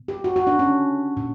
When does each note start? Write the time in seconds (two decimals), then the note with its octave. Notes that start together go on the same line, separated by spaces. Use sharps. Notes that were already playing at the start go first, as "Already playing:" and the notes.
Already playing: B2
0.08 G4
0.24 F#4
0.36 F#4
0.47 D4
0.59 C#4
1.17 A#2